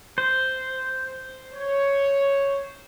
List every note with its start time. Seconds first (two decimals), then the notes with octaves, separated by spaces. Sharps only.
0.18 C5
1.52 C#5